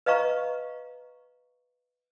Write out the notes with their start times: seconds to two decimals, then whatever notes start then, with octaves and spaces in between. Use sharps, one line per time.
0.06 B4 D#5 F5 A#5 C#6